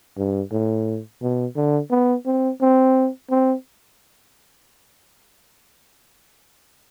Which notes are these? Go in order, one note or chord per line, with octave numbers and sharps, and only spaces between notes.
G2
A2
B2
D3
B3
C4
C4
C4